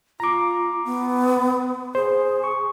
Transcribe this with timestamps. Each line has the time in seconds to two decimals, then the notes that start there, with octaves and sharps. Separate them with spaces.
0.20 F4 A#5 D6
0.85 B3
1.95 G#4 C5
2.44 C#6